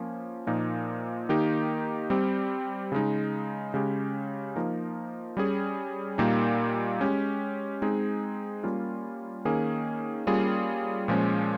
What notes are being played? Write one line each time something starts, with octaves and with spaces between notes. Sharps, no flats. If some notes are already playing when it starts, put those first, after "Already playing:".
Already playing: F3 A#3 C#4
A#2 F3 A#3 D#4
D#3 A#3 D#4 G4
G3 C4 G4
C#3 G#3 D#4
C#3 G#3 C#4 G4
F3 A#3 D#4 A#4
G3 C#4 G#4
A#2 G3 A#3 D#4 G4
G#3 C#4 G4
G#3 C4 D#4 G#4
G3 A#3 C#4 F4
D#3 A#3 C#4 G#4
G3 A#3 C#4 F4 G#4
A#2 F3 G#3 C#4